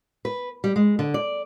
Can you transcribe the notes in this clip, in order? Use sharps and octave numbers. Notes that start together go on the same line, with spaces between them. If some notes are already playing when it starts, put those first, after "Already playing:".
B4
G3
G#3
D3
D5